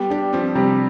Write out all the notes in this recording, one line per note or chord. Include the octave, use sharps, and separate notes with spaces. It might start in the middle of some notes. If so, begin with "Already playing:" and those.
Already playing: G3 B3 G4
D4 G4
F3 C4
C3 G3